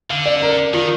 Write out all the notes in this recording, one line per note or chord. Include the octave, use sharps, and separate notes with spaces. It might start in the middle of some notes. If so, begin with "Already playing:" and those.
D3 F5
D5
A#4
D#3 F4